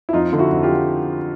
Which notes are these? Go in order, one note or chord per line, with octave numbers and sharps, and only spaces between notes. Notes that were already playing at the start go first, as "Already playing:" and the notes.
E4
F2 D#4 F4
D3
E4 F#4
F2
F4 G4
F3